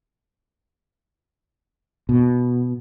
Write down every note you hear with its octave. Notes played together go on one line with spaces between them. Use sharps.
B2